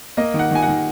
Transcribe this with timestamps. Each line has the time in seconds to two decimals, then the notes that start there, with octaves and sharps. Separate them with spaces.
0.17 A#3 D#5
0.34 D#3
0.39 F#5
0.51 D#3 G#5
0.62 F#5
0.68 D#3